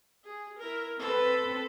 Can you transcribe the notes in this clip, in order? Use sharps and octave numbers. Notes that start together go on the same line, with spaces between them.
G#4
E4 A#4
C4 A4 B4